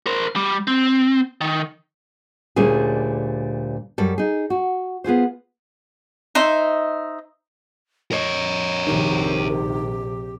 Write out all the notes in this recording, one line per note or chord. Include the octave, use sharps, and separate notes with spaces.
A#4 C5
G3
C4
D#3
D2 A#2 G3 A#3 C#4 G#4
F#2 G3 A4
D#4 G#4
F#4
B3 F4 G#4 C5
D#4 C5 D#5 E5
A#4 C#5 D#5
A#1 C3 D#3 G4